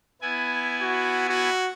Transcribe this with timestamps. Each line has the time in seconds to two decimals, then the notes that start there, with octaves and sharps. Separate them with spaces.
0.22 B3 E4 G#5
0.82 F#4
1.29 F#4